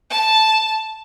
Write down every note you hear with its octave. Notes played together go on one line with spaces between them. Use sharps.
A5